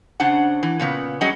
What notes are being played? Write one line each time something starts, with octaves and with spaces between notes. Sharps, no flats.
C#3 D4 C5 F#5
E3
A#2 C#3 B3
F#3 G3 C#4 F#4 G#4 D#5